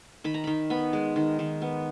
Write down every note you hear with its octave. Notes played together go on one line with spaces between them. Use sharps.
D#3 B5
A#5
D#3 B5
B3 B5
G#3
D#3
D#3
B3